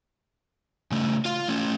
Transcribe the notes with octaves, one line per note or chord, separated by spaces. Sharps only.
C#3 A3
F4 F5
A3 C#4